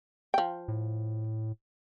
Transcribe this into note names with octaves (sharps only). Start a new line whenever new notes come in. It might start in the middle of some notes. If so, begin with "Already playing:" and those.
F3 G5
A2